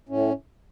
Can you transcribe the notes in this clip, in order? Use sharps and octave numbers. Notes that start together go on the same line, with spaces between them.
A2 C#4